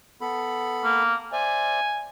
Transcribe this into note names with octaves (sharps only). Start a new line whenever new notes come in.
B3 A4 B5
A#3
C5 D5 E5 G#5